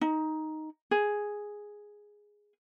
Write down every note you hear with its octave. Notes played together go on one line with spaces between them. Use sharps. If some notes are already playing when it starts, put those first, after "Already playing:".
D#4
G#4